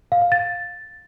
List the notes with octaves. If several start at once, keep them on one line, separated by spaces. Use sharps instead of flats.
F5
F5
A6